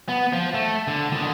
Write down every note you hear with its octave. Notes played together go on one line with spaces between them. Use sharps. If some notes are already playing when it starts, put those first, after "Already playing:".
B3
F3
A3
D3
D3 D#3